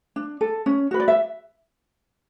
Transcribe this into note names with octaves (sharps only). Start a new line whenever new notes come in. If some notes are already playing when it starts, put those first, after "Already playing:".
D4
A4
C#4
F#4 B4
D5
E5